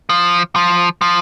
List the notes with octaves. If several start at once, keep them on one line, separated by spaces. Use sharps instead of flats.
F3
F3
F3